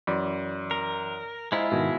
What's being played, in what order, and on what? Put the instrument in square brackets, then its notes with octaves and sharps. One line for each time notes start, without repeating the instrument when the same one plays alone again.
[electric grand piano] F#2 [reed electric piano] E3 D5 B5
[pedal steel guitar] A#4
[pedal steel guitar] G#3 E4 F4 [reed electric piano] C5 D#5 A#5
[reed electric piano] G#2 D#3 [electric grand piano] B2